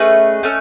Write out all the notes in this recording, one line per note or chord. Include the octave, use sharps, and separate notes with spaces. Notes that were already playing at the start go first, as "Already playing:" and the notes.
Already playing: A3 C#4 G#4 B4 D#5
A3 C#4